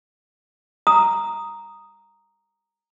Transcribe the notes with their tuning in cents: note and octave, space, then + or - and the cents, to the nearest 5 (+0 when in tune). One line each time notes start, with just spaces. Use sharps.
A#5 +0 D#6 +0